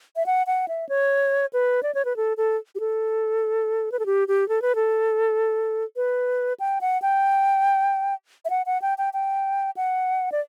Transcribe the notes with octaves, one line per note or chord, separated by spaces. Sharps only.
E5
F#5
F#5
E5
C#5
B4
D5
C#5
B4
A4
A4
G4
A4
B4
A4
G4
G4
A4
B4
A4
B4
G5
F#5
G5
E5
F#5
F#5
G5
G5
G5
F#5
D5